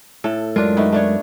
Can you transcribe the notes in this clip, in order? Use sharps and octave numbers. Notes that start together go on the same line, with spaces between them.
A2 A4
F#2 G#3 D4 F4 A#4
D#3 A3 B3
A3 D4 C#5